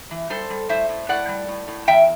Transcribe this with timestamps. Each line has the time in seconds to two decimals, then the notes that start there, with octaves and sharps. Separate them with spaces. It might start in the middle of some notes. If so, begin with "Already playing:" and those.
0.11 E3
0.30 G3 A4 C5
0.50 G3
0.69 A2 C5 E5
0.89 A2
1.09 A2 D5 F#5
1.28 G3
1.48 A2
1.68 A2
1.87 E2 E5 G5